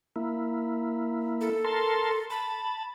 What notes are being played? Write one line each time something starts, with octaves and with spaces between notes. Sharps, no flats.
A#3 E4
A4
A#4 A5 C6
A5 B5